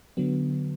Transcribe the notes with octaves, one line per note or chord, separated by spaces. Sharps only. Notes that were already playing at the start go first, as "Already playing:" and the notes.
D3 F#3 B3